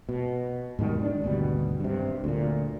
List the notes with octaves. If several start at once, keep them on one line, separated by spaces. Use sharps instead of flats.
B2
G#2 B2 D#3 G3
D4
G#1 D2 B2 G3
G2 C3
D2 A#2